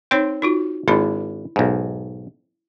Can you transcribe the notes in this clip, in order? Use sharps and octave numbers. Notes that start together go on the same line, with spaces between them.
C4 D#4 C#5 G5 C6
D#4 F4 F#4
G#1 D4 E4 B5
B1 G#2